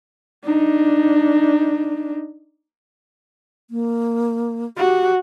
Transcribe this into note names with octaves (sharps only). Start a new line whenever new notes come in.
D4 D#4
A#3
F#4 G4